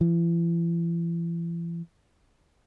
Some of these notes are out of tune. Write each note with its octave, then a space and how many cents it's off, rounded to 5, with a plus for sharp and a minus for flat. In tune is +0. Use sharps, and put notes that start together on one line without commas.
E3 +40